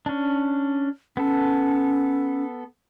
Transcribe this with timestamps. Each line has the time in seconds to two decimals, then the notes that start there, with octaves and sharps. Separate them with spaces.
0.06 C#4 D4
1.17 B3 C#4 A4